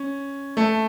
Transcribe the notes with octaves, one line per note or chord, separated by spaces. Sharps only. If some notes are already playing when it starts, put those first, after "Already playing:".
Already playing: C#4
A3